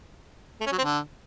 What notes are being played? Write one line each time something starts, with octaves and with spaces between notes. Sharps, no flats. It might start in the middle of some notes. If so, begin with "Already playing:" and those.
A3
C#4
F#3
C4
D3